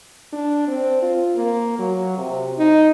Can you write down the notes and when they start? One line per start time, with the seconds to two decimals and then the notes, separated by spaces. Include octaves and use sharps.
0.33 D4
0.67 C4
1.02 F4
1.36 A#3
1.79 F#3
2.18 C3
2.59 D#4